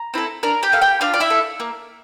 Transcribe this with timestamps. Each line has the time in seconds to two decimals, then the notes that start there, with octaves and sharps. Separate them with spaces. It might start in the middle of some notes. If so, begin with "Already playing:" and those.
Already playing: A#5
0.14 C4 E4 A4
0.43 D4 A#4 A#5
0.63 G4 G5
0.72 A4 F5
0.82 G4 G5
1.01 D4 F4 F5
1.14 D5
1.20 E4 E5
1.30 A4
1.60 A#3